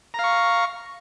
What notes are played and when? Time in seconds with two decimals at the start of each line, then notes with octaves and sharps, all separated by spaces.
0.14 A#5
0.19 F5
0.24 C#6